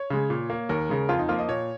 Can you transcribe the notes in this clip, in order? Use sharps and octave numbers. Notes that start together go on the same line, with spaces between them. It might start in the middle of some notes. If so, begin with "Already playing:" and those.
Already playing: C#5
C#3 G#3
A#2
A#3
D#2 A#4
C#3 G#3
F2 F4
D#4
F3 A#3 F4
D#5
A#2 C#5